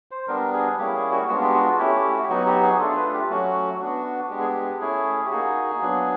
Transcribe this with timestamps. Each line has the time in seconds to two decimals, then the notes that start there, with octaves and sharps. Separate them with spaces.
0.11 C5
0.28 G3 B3 D4 A#4
0.53 G#4
0.78 G3 A#3 C#4 E4 G4
0.95 G#4
1.12 F#4
1.28 G#3 B3 D4 F4 F#4
1.42 G4
1.54 F#4
1.78 A3 C#4 E4 G4
1.96 G4
2.13 F#4
2.23 G4
2.29 F#3 B3 D#4 F#4
2.46 G4
2.63 G#4
2.79 A3 D4 F4 A4
2.96 B4
3.13 G4
3.30 F#3 A3 C#4 F#4
3.80 B3 D4 F#4
4.30 G#3 B3 D4 G4
4.40 G#4
4.48 G4
4.80 A3 C#4 E4 G#4
5.25 G4
5.31 A#3 D#4 F#4 G#4
5.81 F#3 B3 D4